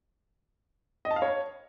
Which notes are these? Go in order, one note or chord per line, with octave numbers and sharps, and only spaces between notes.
D#5
A5
F5
C#5